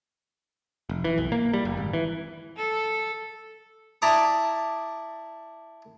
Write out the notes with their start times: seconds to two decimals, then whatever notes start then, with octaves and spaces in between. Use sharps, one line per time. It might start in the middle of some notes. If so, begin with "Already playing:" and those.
0.89 F1
1.04 E3
1.18 B1
1.32 A#3
1.54 G3
1.65 F#1
1.77 G#1
1.93 E3
2.57 A4
4.02 E4 D5 A5 A#5 D6 D#6